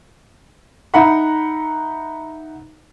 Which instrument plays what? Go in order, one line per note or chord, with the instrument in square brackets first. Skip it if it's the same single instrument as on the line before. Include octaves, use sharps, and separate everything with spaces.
[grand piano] D#4 E5 F#5 A#5 B5